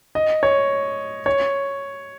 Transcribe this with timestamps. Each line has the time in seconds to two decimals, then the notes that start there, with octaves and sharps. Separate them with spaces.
0.15 D#5
0.43 C#5
1.26 C#5